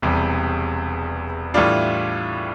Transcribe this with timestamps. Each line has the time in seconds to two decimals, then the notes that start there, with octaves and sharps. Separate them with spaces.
0.02 E1 E2 C3 G3
1.54 A2 E3 G3 D4 F4